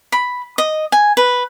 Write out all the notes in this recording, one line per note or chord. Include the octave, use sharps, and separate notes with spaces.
B5
D#5
G#5
B4